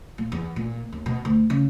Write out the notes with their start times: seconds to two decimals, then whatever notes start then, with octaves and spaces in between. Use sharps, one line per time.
0.18 A#2
0.32 E2
0.56 A#2
0.92 D#2
1.06 B2
1.25 D2
1.50 C#3